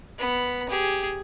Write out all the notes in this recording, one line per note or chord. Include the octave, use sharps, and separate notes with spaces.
B3 B5
G4 G#4